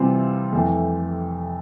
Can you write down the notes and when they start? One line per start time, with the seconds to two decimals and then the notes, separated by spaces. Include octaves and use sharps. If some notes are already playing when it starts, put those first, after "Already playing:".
Already playing: C3 E3 G3 C4 F4
0.53 F2 E3 A3